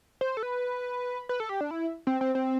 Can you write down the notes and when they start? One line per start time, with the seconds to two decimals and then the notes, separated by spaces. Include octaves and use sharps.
0.21 C5
0.37 A4
0.43 B4
1.29 B4
1.40 A4
1.49 G4
1.61 D4
1.71 E4
2.07 C4
2.21 C4
2.35 C4